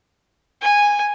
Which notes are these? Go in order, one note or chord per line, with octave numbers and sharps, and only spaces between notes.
G#5